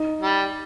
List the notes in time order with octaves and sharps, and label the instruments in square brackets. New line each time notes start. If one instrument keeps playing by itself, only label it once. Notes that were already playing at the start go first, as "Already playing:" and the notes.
Already playing: [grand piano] D#4
[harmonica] G3